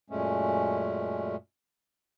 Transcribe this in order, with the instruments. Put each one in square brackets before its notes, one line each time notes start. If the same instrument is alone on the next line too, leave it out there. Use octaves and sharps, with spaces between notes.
[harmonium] F#2 A#2 G#3 A3 C#4